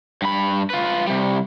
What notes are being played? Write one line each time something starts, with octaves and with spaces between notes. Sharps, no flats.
G2 B5
F4 B4
C3 G3